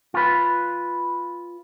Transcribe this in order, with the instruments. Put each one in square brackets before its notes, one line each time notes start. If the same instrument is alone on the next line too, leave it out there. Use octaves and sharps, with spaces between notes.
[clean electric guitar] F4 B4